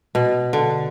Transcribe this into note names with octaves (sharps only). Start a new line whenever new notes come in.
B2
D3